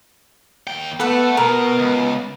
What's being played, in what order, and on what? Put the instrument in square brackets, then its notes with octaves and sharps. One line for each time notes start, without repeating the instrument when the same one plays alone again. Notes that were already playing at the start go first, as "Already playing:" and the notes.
[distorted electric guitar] D#2 G5
[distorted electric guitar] A3 A4 [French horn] B3 [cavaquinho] B4 F#5
[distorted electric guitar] B2 [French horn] B3 [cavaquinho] A#4
[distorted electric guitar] C#2